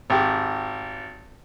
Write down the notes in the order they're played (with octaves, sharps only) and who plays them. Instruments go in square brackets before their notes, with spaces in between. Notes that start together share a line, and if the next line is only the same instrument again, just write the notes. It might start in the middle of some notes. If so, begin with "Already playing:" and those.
[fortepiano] G#1 G4